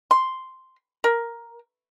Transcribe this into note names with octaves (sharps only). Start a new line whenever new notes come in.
C6
A#4